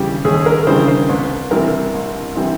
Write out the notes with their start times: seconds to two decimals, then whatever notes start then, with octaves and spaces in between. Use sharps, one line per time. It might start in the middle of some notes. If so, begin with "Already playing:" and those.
Already playing: D#2 C#3 E3 G3 G4
0.25 D#2 G#4
0.46 A#4
0.67 C#3 E3 G3 C5
0.88 C5
1.09 C2 B4
1.51 C3 E3 G3 A#4
1.94 C2
2.35 C3 E3 G3